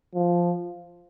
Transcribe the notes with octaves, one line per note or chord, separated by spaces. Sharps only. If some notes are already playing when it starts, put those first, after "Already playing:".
F3